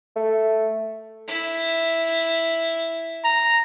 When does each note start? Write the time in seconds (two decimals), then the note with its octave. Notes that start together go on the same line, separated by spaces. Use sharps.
0.16 A3
1.28 E4
3.24 A#5